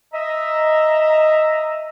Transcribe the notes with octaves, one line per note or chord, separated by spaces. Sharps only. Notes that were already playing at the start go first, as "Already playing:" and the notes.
D#5 E5 A#5